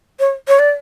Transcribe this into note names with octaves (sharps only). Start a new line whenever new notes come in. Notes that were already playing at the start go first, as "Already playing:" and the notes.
C#5
C#5
D5